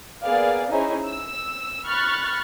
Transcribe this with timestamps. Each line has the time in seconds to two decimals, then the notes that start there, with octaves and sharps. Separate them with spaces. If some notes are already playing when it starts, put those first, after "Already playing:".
0.25 A#3 B3 G#4 D5 F5
0.70 C#4 D#4 E4 G#4 C5
1.07 E6
1.85 B5 C#6 F6 F#6 A6